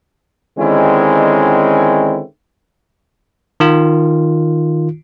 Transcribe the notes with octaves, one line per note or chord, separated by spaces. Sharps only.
D3 D#3 G#3 C4 C#4 E4
D#3 F4